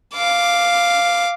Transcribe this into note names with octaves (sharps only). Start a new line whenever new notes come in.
F5 D6